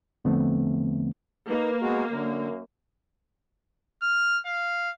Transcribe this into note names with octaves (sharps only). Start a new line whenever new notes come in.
E2 D3 F3 A3 B3 C4
A#3 D#4 B4
G#3 B3 F#4
F#2 D3
F6
F5